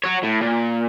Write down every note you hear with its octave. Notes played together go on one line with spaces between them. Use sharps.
F#4 C#5
A2
A#2